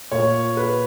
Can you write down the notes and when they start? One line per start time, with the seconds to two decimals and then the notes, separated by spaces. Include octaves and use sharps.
0.12 A#2 C#5
0.57 B4